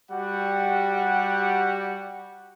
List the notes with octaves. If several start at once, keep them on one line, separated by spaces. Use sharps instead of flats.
G3 F#4 G4 F#5